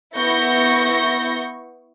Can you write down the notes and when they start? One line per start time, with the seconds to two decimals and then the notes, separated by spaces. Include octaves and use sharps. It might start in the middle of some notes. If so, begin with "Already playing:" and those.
0.16 B3 E4 C#6 G6 A#6